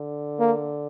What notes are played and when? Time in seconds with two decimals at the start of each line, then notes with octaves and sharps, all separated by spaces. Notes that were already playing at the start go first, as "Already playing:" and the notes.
Already playing: D3
0.39 A#3